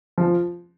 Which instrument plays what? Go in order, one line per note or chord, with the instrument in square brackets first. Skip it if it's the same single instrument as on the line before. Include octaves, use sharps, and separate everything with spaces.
[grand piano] F3